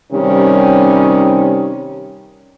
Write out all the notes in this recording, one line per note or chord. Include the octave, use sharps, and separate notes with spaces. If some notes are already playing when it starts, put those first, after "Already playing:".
C3 D#3 G3 C#4